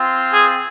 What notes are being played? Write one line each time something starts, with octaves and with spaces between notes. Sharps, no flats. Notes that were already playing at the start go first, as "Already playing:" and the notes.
Already playing: C4 F4
G#4